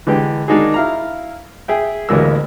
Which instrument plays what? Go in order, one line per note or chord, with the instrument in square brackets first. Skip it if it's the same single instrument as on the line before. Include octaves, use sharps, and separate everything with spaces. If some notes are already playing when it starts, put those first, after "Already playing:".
[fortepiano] D3 E3 G#3 G4
D#3 G#3 D4 D#4 F#4 G#4
E4 F5 A#5
G#4 E5 G5
A1 D2 E3 G#3 A#3 E6